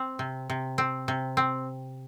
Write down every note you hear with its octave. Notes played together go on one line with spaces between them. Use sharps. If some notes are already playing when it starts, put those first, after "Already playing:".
Already playing: C4
C3
C3
C4
C3
C4